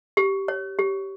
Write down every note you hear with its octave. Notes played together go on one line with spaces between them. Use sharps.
G4
C#5
G4